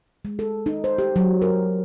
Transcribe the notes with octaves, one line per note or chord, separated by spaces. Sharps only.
G#3
A4
D#4
C5
G4
F#3
A#4